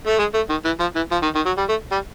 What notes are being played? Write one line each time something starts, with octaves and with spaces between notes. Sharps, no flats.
A3
G#3
A3
D#3
E3
F3
E3
F3
D#3
D#3
F#3
G3
A3
G3